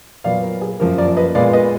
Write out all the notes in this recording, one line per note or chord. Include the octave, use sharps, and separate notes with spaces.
A#2 F#3 B3 D5 F5
A#4
G#4
F#2 F3 A#3 A#4
A#4 D5
B4 D#5
A#2 G#3 B3 D5 F5
B4 D#5